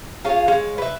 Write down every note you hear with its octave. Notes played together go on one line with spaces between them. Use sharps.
F4 G#4 C#5 F5
G#3 C#5 F5
B4 E5